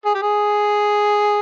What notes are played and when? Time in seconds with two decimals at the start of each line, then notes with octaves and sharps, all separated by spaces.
0.06 G#4
0.14 G4
0.22 G#4